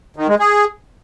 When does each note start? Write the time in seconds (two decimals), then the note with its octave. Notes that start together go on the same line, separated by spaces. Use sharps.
0.16 D#3
0.28 G#3
0.39 G#4